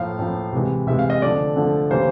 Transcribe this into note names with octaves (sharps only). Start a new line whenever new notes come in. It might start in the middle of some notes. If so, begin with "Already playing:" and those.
Already playing: A2 F3 A#3 F5
A2 F3 A#3
C3 E3 G#3
C3 E3 G#3 E5
F5
D#5
D3 F3 A3 D5
D3 F3 A3
C#3 E3 G3 A#3 C5